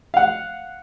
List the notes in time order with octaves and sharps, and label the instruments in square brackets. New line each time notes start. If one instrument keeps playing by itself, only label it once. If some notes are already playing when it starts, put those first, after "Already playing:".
[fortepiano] F5 F#5